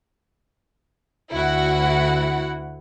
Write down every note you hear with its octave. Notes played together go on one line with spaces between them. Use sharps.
D2 D3 E4 F#4 F#5